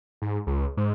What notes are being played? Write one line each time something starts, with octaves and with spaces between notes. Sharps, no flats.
G#2
C#2
G#2